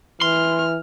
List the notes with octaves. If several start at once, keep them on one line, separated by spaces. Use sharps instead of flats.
E3 C6 F6